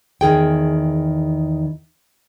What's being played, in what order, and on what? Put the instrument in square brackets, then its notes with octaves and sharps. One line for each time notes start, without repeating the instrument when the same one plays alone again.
[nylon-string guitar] E2 D#3 G#4 G5